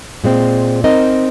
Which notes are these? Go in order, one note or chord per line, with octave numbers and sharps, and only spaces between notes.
A#2 G#3 C4
C4 D#4 A#4 D#5